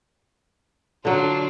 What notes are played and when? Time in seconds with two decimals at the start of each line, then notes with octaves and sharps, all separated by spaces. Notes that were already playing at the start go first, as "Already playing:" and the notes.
1.05 D3 F#3 D4 F4